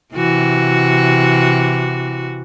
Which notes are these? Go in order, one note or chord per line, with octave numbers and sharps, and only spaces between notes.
C3 E3 F#4